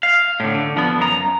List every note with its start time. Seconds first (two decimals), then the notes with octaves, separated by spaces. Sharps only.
0.03 F5
0.40 A2 D3
0.54 D3
0.77 F3 B3
0.98 F#2 A#5